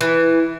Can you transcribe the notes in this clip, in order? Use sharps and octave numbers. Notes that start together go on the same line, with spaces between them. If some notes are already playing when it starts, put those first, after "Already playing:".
E3